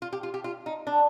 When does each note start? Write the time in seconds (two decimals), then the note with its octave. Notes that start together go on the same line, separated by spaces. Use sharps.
0.02 F4
0.13 G4
0.23 F4
0.34 G4
0.44 F4
0.66 D#4
0.87 D4